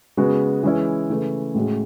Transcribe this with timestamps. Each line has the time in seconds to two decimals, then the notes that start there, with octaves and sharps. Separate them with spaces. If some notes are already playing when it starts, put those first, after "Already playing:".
0.17 C#3 G#3 B3 F#4
0.63 E3 G#3 C#4 E4
1.10 C#3 E3 A3
1.55 A2 G#3 C#4 F#4